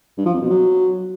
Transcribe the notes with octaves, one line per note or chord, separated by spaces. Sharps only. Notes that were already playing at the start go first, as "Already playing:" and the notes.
G2
F3
F2
B2
F#3